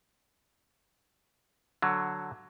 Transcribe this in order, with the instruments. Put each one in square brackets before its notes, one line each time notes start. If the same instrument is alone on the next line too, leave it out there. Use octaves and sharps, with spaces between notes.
[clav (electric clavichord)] D3 F#3